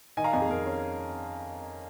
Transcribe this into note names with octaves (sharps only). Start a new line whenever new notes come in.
D#3 D#5 G#5
F5 A#5
F2 D#5 G#5
G#4
F2 A#4
C#4